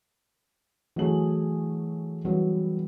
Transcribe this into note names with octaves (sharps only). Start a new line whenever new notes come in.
E3 F#3 A3 G#4 F#7
E3 F#3 G3 B3